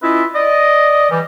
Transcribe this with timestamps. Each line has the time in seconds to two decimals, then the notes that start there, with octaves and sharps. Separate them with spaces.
0.03 C#4 E4 F4 B4 D#5 E5
0.35 D5 D#5
1.10 E3 G3